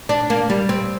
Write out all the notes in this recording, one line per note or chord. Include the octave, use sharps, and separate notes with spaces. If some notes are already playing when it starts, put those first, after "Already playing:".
D4
A#3
G3
C4